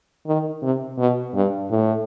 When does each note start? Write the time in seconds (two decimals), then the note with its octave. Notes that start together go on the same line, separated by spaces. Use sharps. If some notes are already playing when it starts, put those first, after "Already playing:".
0.26 D#3
0.62 C3
0.98 B2
1.34 G2
1.70 A2